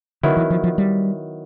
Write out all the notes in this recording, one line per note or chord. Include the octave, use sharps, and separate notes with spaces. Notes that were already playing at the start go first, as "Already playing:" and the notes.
D3 D#3 F#3 B3 E4
E3
F3
F3
G3